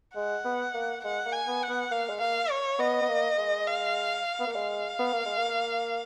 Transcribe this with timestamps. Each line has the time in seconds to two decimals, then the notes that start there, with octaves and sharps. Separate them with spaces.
0.16 G#3 F#5
0.45 B3
0.74 A#3
1.04 G#3 F#5
1.26 A#3
1.32 G#5
1.47 B3
1.63 F#5
1.69 B3
1.91 A#3 F5
2.09 G#3
2.20 A#3 F5
2.50 C#5
2.79 B3 D#5
3.02 B3
3.08 A#3
3.38 G#3
3.67 F5
4.40 B3
4.47 A#3
4.55 G#3 F5
4.99 B3
5.13 A#3
5.25 G#3
5.38 A#3